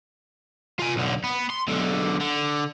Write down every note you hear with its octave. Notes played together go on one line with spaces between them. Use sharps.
F4 G#5
B1 D3
B3
C6
B1 D3
D3